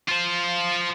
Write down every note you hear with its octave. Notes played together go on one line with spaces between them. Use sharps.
F4 C5